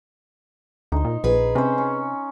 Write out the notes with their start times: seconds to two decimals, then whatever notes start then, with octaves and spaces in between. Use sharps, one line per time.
0.92 D2 D#4 C5
1.04 A#2
1.24 A#1 G#4 B4
1.55 C3 C#4 C5
1.78 C#4